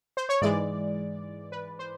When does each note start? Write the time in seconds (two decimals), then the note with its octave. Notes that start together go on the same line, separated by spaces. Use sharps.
0.17 C5
0.29 C#5
0.41 G#2 E3 G#3 D5
1.52 B4
1.79 C5